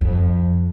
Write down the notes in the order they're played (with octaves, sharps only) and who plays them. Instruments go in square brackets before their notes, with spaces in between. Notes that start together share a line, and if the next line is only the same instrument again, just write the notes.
[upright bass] F2